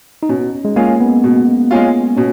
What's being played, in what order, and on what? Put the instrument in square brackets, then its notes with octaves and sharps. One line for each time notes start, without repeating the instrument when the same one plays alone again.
[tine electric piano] D#4
[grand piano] B2 [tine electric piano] C#4
[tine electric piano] G#3
[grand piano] G#3 C#4 F4 [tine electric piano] A#3
[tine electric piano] B3
[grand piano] B2
G#3 C#4 F4
[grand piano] B2 [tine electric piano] C#4